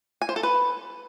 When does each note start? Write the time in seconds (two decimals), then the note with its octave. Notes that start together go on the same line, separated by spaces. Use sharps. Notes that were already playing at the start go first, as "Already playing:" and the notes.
0.22 G#5
0.29 C5
0.36 A4
0.43 B4